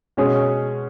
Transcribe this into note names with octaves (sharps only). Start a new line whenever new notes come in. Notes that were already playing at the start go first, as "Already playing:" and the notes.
B2 G#3 C#4 G#4 C#5